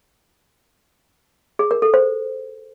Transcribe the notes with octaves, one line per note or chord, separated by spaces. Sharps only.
G#4
A#4
A4
C5